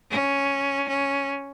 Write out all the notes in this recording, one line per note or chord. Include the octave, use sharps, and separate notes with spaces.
C#4
C#4